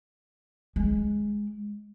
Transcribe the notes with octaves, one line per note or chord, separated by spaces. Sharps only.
G#3